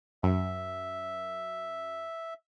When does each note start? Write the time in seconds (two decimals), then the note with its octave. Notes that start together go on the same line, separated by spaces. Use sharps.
0.23 F#2 E5